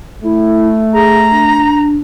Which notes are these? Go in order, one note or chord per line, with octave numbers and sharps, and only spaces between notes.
A3 E4
G#4 A#5
D4